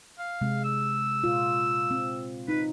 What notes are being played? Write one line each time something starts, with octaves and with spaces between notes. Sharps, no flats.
F5
C3 G#3
E6
A#2 F4
C4
D#4 B4